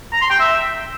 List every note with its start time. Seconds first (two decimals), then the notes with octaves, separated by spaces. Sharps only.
0.12 A#5
0.21 C6
0.30 G5
0.39 E5